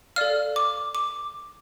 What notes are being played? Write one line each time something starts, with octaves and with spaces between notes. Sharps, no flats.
A4 D5 F5 F6
D6
D6